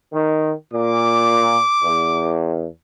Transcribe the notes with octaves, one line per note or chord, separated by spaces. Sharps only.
D#3
A#2 D6
E2